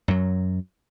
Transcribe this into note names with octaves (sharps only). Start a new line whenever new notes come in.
F#2 F#3